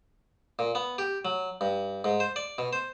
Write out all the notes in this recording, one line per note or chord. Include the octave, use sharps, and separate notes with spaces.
A#2
B3
G4
F#3
G2
G#2
C5
D5
B2
C5